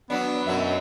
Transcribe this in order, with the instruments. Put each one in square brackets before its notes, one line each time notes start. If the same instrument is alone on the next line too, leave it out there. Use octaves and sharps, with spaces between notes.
[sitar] F#3 D4 [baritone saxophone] B3
[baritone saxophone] F#2 [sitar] B2 F#3 E5